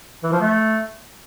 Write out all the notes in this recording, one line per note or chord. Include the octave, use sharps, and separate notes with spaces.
E3
F3
A3